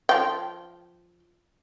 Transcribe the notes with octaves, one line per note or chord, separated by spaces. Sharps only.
F3 G5